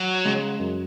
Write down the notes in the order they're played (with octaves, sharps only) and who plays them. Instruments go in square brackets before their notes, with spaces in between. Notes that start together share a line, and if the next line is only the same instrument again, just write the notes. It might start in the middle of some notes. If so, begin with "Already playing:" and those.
Already playing: [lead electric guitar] F#3
[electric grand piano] C#3 G#3
F#2